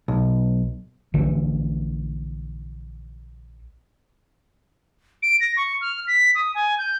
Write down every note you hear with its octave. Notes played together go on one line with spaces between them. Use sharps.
B1
A#1 D3 E3
D7
A#6
C#6
F6
B6
D#6
G#5
G6